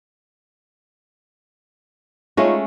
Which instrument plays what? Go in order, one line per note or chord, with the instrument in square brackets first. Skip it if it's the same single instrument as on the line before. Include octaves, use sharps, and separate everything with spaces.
[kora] G#3 A3 C#4 [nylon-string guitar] D#4 F4